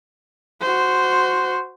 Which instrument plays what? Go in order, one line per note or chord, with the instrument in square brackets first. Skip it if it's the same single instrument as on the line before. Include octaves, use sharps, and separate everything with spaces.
[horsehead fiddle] F#4 C5